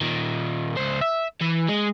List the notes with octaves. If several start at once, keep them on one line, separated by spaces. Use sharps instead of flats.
A#2 D#3
C#2 C5
E5
E3
G#3 G#4